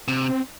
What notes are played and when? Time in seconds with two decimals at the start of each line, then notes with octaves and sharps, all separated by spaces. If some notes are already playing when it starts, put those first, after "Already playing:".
0.08 C3
0.29 C4